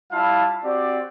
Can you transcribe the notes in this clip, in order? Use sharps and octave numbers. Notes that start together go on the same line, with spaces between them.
G3 E4 F4 F5 A5
C4 F#4 G4 D5